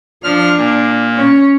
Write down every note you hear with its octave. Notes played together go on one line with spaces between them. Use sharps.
F3 D4 F6
A#2
C#4